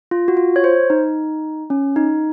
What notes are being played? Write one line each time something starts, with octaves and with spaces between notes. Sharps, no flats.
F4
F#4
F4
C#5
C5
D#4
C#4
D#4